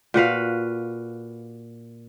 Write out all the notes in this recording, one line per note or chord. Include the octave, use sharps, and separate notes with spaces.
A#2 F#4 B4 F5